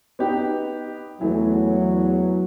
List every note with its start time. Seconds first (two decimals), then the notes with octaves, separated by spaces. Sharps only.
0.19 B3 D#4 G4
1.21 E2 E3 F#3 A3